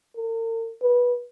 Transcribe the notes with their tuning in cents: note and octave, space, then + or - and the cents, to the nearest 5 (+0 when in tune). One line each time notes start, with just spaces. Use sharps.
A#4 -45
B4 -20